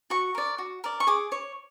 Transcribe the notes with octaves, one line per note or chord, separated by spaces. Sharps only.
F#4 C#6
A#4 D5
F#4
A#4 D5
C#6
G#4 D6
C#5